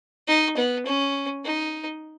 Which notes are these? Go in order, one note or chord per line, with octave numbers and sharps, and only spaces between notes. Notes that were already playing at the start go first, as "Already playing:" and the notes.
D#4
B3
C#4
D#4